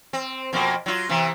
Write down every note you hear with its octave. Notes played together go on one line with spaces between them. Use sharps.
C4
F2 B2 A#3
F#3 F4
C3 E3 B3